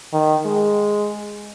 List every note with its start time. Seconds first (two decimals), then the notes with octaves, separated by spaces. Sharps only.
0.13 D#3
0.45 G#3